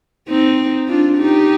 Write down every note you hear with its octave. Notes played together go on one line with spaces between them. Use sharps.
C4 D#4
D4 F4
D#4 G4